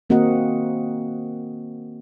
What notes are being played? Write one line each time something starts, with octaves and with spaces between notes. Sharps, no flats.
D#3 A#3 C4 F#4 D#5 F#5